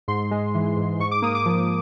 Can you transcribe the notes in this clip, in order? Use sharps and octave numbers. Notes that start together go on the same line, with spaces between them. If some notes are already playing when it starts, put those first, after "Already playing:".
G#2 C6
G#3
E3
G#2
G#2 C#6
D6
A#3 D#6
D6
F3